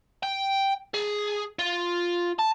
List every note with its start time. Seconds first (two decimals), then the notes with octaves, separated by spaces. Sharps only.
0.23 G5
0.94 G#4
1.59 F4
2.39 A5